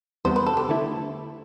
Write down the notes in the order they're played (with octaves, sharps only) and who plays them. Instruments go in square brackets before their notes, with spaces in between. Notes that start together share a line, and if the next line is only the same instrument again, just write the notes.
[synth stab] E2 C3 G3 B3 [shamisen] C5
[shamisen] B4
A4
G4
[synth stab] D3 A3 E4